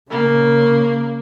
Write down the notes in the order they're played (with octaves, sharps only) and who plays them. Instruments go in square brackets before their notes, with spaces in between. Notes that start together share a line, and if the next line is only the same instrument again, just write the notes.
[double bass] C#3 [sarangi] A#3